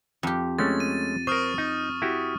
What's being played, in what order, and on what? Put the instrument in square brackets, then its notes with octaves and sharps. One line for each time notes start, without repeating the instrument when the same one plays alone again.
[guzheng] F2 G4
[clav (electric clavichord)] G#3 A3 C#4 [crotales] A6
[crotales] D#7
[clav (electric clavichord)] A#4 C5 [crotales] C#6 D#6 F6
[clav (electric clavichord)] D#4
E4 F#4 G4